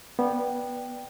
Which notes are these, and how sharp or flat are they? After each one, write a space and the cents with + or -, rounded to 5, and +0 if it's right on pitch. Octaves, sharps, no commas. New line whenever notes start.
B3 -15 D5 +0 G5 +0